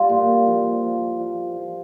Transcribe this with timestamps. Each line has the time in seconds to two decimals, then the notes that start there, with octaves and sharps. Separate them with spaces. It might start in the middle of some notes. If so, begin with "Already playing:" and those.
Already playing: G3 F4
0.09 A#2
0.47 F3
0.83 F3
1.19 F3
1.56 F3